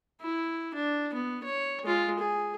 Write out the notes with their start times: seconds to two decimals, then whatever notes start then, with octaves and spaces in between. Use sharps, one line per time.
0.21 E4
0.74 D4
1.14 B3
1.44 C#5
1.84 G#3 F4
2.20 G#4